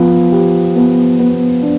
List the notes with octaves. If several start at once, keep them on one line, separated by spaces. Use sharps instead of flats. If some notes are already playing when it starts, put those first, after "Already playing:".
Already playing: F3 B3
G4
B3
B3
D4